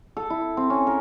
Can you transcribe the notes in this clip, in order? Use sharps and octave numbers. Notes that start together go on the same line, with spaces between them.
A4
E4
C4
C#4
A#4